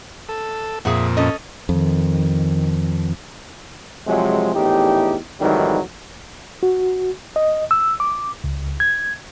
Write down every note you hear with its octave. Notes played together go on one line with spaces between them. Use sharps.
A4
F2 A#2 G#4 E5 F#5
C#4 A4 D#5
F2 D#3
C3 F3 F#3 G#3
A#1 E2 A2 D#4 G4
F2 G#2 D#3 E3 F#3 G3
F#4
D#5
E6
D6
C#2
G#6